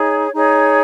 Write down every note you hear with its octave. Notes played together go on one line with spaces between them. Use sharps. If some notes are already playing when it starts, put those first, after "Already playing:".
Already playing: D#4 G#4 C#5
D#4 G#4 C#5